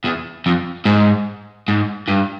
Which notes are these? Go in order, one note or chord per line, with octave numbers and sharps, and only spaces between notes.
E2
F2
G#2
G#2
G2